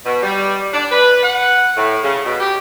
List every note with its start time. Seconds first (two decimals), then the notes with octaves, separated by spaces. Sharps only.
0.06 B2
0.23 G3
0.73 D4
0.91 B4
1.23 F#5
1.76 A2
2.03 C#3
2.25 B2
2.40 G4